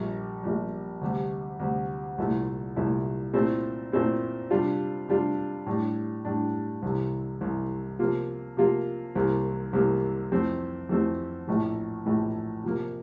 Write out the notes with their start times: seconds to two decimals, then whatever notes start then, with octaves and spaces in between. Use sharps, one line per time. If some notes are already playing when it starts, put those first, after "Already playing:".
Already playing: A#1 A#2 G3
0.43 A#1 A#2 G3
1.01 D2 C3 G3
1.60 D2 C3 G3
2.18 C2 A#2 A3 E4
2.76 C2 A#2 A3 E4
3.34 A#2 A3 C4 E4
3.92 A#2 A3 C4 E4
4.51 C3 G3 D4 F4
5.08 C3 G3 D4 F4
5.66 A2 G3 D4
6.25 A2 G3 D4
6.82 C2 C3 E3
7.41 C2 C3 E3
7.99 C3 F3 A#3 F4
8.57 C3 F3 A#3 F4
9.15 C2 C3 E3 A#3
9.73 C2 C3 E3 A#3
10.32 F2 E3 A3 C4
10.89 F2 E3 A3 C4
11.47 A#1 A2 E3
12.06 A#1 A2 E3
12.64 C3 F3 A#3